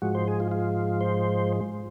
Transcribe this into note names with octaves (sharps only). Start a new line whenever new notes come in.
G#2 F3 G#3 F#4
C5
G#4
F4
F4
C5